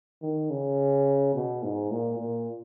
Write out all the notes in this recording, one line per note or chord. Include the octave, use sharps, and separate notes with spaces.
D#3
C#3
B2
G#2
A#2
A#2